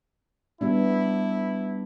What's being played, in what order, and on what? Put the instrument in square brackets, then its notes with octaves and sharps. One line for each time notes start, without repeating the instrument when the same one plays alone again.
[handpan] G3 B3 D4 [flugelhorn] E4